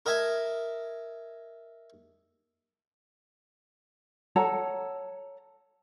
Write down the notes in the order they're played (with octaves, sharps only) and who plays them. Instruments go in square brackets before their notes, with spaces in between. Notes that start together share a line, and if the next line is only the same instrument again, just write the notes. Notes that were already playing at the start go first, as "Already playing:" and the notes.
[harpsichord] A#4 D#5 E5 G#5 A5
[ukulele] A4 C#5 F#5 A#5